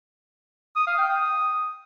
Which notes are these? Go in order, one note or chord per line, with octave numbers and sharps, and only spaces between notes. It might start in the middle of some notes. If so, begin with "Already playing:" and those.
D#6
F5
G5
D#6